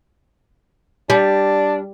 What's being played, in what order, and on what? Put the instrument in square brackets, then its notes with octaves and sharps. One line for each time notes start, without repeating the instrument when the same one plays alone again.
[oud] G3 [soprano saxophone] D4